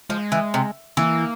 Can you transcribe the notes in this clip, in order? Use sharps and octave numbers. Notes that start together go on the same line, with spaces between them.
F3 G#3
E3
C3
E3 A#3